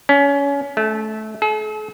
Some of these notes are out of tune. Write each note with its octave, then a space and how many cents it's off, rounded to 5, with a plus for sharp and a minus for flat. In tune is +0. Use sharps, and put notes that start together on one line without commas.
C#4 +25
A3 -20
A4 -45